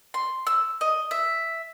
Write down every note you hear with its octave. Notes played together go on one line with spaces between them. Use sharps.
C6
E6
D#5
E5